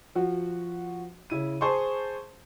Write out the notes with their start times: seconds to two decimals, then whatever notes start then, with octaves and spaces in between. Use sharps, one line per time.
0.15 F3 F#4
1.30 C#3 E4 D#7
1.61 G#4 C5 A5 C6 C#6